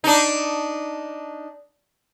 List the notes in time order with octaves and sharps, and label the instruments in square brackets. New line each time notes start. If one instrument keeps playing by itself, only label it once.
[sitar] D4 D#4